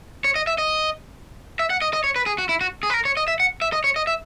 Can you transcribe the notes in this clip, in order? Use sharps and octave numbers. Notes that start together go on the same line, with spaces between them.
C#5
D#5
E5
D#5
E5
F#5
D#5
D#5
C#5
B4
G#4
F#4
E4
F#4
G#4
B4
A#4
C#5
D#5
E5
F#5
E5
D#5
C#5
D#5
E5